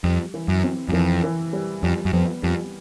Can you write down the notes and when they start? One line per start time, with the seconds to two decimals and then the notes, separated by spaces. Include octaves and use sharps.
0.04 F2 G3
0.34 E3
0.48 F#2
0.64 C4
0.89 F#2
0.93 F2 E3
1.24 E3
1.53 G3
1.83 F2 G3
2.05 F#2
2.13 F2 B3
2.43 F2 G3